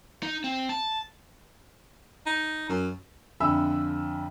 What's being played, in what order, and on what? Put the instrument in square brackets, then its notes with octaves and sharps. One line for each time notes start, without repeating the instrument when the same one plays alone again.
[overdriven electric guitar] D#4
C4
A5
[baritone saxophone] D#4
F#2
[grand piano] F2 D3 E5 G#5 B5 E6